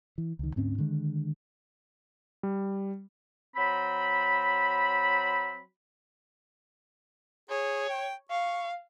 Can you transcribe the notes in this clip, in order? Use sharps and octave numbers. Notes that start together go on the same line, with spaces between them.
E3
C#2 D#3
D2 G#2 C4 C#4
D3 D#3 G#3
G3
F#3 C4 B5
G#4 C#5
G5
F5 C#6